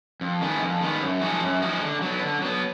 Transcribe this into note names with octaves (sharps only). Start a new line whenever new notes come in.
F2
D#3 G#3 B3
F2
D#3 G#3 B3
F#2
F3 G#3 D#4 F#4
F#2
F3 G#3 D#4 F#4
D3
F#3 B3
D3
F#3 B3